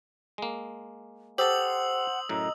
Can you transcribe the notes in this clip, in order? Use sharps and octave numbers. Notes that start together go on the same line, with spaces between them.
G#3 A#3
G4 A4 C5 F#5 D#6 E6 F#7
F#2 A2 D#5 A#5